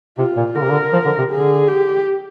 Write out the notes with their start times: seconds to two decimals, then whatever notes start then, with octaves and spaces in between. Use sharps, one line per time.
0.18 C3 F4
0.37 A#2
0.55 D3 A#4
0.63 C3
0.70 D3
0.93 F3
1.05 D3
1.18 C3
1.31 D3 G#4
1.68 G4